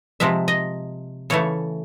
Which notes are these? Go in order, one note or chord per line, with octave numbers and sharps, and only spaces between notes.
C3 F3 G#3 E5
D#5
C#3 E3 A3 C#5